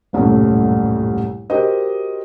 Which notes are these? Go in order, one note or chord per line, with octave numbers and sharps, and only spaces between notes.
D#1 C2 F#2 A2 A3
F#4 G4 A#4 C5 D#5